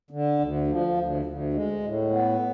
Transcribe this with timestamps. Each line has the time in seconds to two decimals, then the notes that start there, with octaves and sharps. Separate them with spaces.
0.11 D3
0.39 D2
0.67 F3
0.97 D2
1.25 D2
1.54 G#3
1.83 A2
2.11 B3